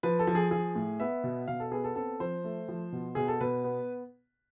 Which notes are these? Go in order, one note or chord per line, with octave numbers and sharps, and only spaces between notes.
F3 B4
A4
F3
G#4
F3 G#4
A2
B3 E5
B2
B2 F5
A4
B3 G#4
A4
C4 A4
F3 C5
A3
F3
B2
B2 G#4
A4
B2 B4
B3